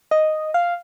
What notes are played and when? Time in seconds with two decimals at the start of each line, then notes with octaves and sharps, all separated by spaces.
0.11 D#5
0.54 F5